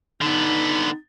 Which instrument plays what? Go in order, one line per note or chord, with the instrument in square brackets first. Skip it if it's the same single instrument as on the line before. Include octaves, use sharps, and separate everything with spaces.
[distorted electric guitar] D3 B3 [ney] D#4